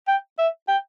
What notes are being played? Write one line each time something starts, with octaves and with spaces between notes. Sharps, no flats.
G5
E5
G5